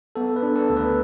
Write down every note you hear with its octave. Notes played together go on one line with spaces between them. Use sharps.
B3 A4
B4
D4
A4
D2
B4